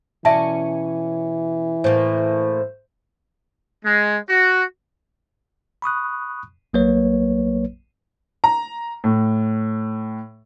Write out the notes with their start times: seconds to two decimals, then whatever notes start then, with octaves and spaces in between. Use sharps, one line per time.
0.25 B2 E3 C#4 D5 E5 A5
1.84 A2 A#3 C5
3.85 G#3
4.29 F#4
5.82 B5 C#6 D#6 F#6
6.73 A#1 F#3 A#3 B4 C#5
8.44 A#5
9.04 A2